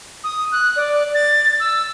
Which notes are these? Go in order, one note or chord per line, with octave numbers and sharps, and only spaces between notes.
D#6
F#6
D5
A6
E6